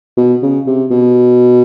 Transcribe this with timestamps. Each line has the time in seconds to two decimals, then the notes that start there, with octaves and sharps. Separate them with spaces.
0.17 B2
0.42 C#3
0.67 C3
0.90 B2